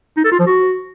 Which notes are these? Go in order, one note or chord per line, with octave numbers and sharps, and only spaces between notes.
D#4
A4
F4
F3
F#4